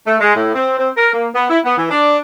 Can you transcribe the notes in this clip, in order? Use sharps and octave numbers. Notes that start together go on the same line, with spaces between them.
A3
G#3
A2
C4
C4
A#4
A#3
B3
E4
B3
E3
D4